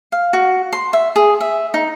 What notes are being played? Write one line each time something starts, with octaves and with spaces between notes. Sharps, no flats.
F5
F#4
C6
E5
G#4
E5
D#4